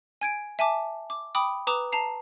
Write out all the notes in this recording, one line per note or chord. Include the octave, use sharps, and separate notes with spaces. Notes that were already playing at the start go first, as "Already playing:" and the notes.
G#5 G#6 D7
E5 G#5 A5 D6
D6
G5 B5 D6 D#6
B4 A#5 D6 D#6 E7
A5 A#5 C7